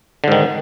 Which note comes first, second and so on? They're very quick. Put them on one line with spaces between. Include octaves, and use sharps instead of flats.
D3 G#2 D#3